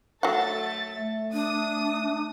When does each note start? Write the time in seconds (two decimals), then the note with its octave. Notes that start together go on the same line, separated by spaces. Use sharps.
0.23 F#3 A3 A4 F#5 A6
0.96 A3
1.33 D4 D#6